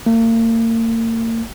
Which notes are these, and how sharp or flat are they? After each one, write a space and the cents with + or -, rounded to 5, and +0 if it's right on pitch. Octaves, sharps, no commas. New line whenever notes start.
A#3 -40